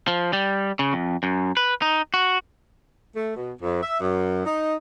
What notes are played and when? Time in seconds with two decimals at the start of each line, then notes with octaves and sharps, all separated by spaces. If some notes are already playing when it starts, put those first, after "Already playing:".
0.08 F3
0.33 G3
0.79 C#3
0.93 F2
1.23 F#2
1.57 B4
1.82 D#4
2.14 F#4
3.16 A3
3.37 B2
3.61 F2
3.82 E5
4.01 F#2
4.45 D#4